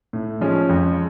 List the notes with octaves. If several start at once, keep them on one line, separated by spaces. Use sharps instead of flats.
A2
F3 G#3 C#4
F2